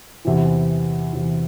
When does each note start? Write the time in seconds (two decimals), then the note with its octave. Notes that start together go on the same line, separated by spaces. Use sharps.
0.25 E2 C3 E3
1.13 E2 C3 E3